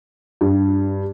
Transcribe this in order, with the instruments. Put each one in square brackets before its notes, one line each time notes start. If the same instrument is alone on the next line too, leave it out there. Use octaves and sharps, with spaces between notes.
[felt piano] G2